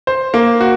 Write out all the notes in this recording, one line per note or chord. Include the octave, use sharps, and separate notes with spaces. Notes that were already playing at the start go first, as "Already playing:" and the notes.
C5
A#3
F#4